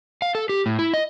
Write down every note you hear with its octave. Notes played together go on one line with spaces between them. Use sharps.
F5
A4
G4
A2
E4
D#5